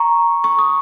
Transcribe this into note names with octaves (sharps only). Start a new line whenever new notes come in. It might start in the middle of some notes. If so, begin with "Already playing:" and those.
Already playing: A#5 C#6
C#6
D#6